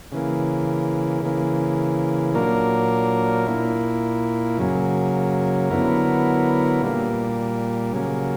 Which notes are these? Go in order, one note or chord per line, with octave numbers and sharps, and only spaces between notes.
C#3 E3 A#3
C#3 E3 A#3
A#2 F#3 A#3 D4 A#4
A#2 A#3 E4
F#2 C#3 F#3 A#3
D3 F#3 B3 E4 A#4
A#2 G3 A#3
C#3 F#3 A#3